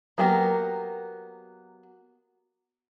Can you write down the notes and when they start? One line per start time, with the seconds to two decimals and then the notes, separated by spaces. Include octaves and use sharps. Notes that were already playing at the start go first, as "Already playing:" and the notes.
0.18 F#3 A#3 B3 G4 A#4